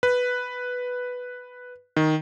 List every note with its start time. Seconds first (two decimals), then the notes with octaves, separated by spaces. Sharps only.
0.03 B4
1.97 D#3